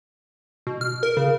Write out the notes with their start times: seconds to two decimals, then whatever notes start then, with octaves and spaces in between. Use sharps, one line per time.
0.67 B2
0.81 F6
1.03 A#4
1.17 C#3